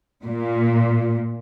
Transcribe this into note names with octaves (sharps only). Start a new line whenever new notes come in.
A#2